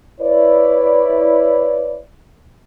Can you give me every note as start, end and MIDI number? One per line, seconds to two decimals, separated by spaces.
0.21 1.99 64
0.21 1.99 71
0.21 1.99 73
0.21 1.99 74